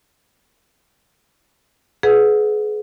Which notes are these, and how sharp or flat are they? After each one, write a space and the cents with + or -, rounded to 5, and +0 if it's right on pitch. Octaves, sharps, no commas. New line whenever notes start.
G#4 +30 B4 +15 F#5 -25